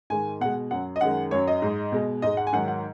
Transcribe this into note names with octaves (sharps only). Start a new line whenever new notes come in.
G#2 D#3 G#3 G#5
B2 G#3 F#5
F#2 F#3 F#5
D#5
F#2 D#3 G#3 F#5
F#2 F#3 C#5
D#5
G#2 G#3
B2 G#3
G#2 G#3 D#5
F#5
G#5
G#2 D#3 F#3 F#5
F#5